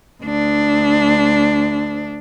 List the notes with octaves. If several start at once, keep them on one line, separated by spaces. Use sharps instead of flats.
D2 D4